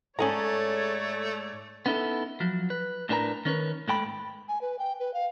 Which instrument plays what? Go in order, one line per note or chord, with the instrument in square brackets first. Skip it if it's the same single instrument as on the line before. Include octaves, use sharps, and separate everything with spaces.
[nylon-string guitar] G#2 A4 [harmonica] A3 [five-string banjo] C#4 G#4 A#5 [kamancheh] C#5 D5
[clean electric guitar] B3 C#4 D#4 E4 A4
F3 F#3
B4
A2 D4 A#4 B4 G#5 A#5
D#3 C#4 A#4 B4
G#2 A3 G5 B5
[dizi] G#5
B4
G5
B4
F5